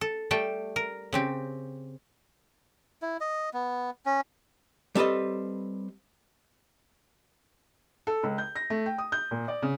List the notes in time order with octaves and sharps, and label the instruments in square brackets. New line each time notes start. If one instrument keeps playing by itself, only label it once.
[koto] A4
G3 A3 G5 A5
A#4
C#3 C4 G4
[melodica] E4
D#5
B3
C#4
[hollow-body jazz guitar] G3 C4 A4 B4 D#5
[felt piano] A4
C#2
G6
A#6
A3
G5
D#6
G6
A#2
D5
C#3